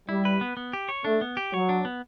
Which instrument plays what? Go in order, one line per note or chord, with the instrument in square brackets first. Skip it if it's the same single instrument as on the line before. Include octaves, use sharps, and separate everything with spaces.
[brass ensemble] G3 [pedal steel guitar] E4
[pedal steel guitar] B4
B3
B3
G4
C#5
[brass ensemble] A3 [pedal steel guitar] D4
[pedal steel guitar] B3
G4
[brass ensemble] F#3 [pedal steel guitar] C#5
[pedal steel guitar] D4
B3